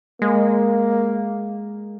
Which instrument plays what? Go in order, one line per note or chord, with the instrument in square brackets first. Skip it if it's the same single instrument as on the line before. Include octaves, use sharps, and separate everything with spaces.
[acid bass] G#3 [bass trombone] A#3